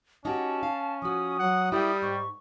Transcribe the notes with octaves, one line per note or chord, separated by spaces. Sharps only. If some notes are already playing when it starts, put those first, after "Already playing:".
C#4 D#4 F#4 G4 A5
F5
F3 F#4 D#6
F#3 F#5
G3 E4 G4 A#4
G#2 C#6